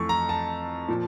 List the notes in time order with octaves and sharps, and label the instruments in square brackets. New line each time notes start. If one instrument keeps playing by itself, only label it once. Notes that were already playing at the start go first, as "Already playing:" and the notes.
Already playing: [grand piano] F2 E3 A3 C#6
A#5
A5
A#2 F3